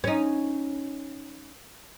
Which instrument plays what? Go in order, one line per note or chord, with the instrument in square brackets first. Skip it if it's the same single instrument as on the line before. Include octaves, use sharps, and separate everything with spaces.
[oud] C#4 D#4